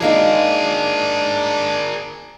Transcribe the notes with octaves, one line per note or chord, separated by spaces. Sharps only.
G#3 A#3 D4 D#4 G#4 A#4